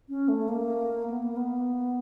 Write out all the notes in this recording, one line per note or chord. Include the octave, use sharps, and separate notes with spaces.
C#4
A3
A#3
B3
A#3
B3